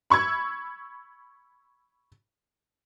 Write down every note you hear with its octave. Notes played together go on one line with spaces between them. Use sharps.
B5 C#6 E6 G#6